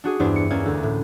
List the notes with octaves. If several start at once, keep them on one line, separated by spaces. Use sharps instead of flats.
D4 F#4 G#4
E2 G2 D4 E4 C5 D5
C#7
E2 A#3 C#4 D5 G#6
D2
A2